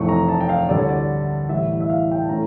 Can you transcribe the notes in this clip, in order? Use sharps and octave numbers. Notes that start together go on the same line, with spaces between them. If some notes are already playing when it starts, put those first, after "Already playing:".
Already playing: F1 F2 E3 A3 E4 C#6
A#5
A5
G5
F5
D2 D3 G3 D5
C#5
D5
A1 A2 E3 G3 E5
E5
F5
G5
A5
A2 E3 A3 C#4 A#5